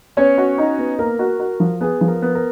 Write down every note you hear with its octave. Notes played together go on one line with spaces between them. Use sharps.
B3 C#4 C#5
F#4
D#4
B3
A#3 A#4
F#4
F#4
F3
B3 G#4
F3
A#4
B3
A#4